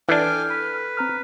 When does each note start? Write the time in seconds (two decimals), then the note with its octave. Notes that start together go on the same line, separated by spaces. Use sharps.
0.09 E3 D4 A4 G5 G#5 D6 F6
0.49 B4
0.97 C4 A#5 F6